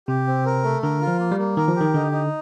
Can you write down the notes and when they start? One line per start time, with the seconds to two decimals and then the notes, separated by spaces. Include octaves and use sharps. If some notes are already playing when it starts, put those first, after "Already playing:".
0.08 C3 G4
0.27 C4
0.46 A#4
0.64 A3
0.82 D3 A#4
1.01 F4
1.07 F3
1.19 A#3
1.32 G3
1.38 A#3
1.57 D#3 A#4
1.68 F3
1.76 D#3 G4
1.94 D3 D#4
2.12 D#4